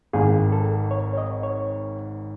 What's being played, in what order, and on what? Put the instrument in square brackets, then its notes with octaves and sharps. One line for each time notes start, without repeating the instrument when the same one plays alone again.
[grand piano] G#1 G#2 D#3 [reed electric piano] G#4
[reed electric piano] A4
C#5
C#5
D#5
C#5